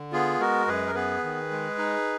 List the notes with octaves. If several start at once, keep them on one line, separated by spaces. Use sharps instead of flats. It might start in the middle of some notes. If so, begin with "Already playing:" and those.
Already playing: D3
B3 F4 G#4
G#3 F#4 A#4
F#2 G#4 B4
A#4
B3 G#4 B4
D#3
G#3
D#4